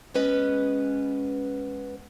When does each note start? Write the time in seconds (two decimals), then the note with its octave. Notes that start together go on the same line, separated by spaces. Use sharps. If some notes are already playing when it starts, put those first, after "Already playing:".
0.14 G#3 B3 C#4 B4 D#5